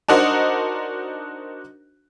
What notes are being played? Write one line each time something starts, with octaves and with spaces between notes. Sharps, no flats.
D4 D#4 F#4 A#4 C5 D#5